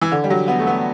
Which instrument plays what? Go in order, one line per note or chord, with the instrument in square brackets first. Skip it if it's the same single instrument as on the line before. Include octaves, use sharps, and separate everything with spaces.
[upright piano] E3
D3
G3
F#3
B3
A3
B3